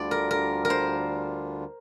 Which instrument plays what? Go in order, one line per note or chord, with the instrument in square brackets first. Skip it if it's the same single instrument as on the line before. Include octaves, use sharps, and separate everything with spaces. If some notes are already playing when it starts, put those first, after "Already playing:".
Already playing: [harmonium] D2 D3 G3 D4 F4 [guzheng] D5
[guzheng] A#4
A#4
A#4
C5